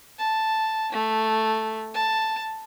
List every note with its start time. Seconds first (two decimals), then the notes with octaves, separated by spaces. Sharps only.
0.18 A5
0.92 A3
1.94 A5